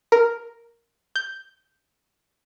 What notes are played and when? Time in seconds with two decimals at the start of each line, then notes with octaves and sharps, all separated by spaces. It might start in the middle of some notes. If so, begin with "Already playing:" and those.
0.12 A#4
1.16 G6